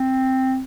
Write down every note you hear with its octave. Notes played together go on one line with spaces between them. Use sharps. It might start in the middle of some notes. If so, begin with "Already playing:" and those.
Already playing: C4